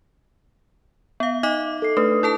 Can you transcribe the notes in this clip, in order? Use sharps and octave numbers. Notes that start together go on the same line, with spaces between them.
B3 E5 F5
D#4 D#5 D6
A4 C7
A3 D4 B4 D#6
E4 A4 A5